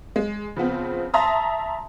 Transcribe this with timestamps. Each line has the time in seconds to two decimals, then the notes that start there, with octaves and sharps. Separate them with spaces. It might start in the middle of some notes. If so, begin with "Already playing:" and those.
0.16 G#3
0.56 C#3 F3 B3 C4
1.14 E5 A5 A#5 C6 D#6